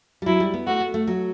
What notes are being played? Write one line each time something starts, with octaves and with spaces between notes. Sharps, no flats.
G3
F#3 E4
G3
B3
A3 F#4
B3
A3
F#3